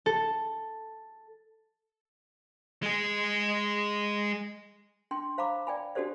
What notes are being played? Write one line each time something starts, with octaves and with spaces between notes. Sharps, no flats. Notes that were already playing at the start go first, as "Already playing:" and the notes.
A4
G#3 G#4
D4 G5 C6
C5 F5 A#5 B5 D6
D5 G5 G#5 B5
D4 F#4 G4 A4 C5 D5